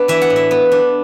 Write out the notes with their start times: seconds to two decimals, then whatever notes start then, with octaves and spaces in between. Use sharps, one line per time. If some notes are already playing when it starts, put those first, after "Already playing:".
Already playing: B3 D4
0.08 E3 E5
0.22 F#5
0.30 A2
0.36 E5
0.51 B3
0.72 D4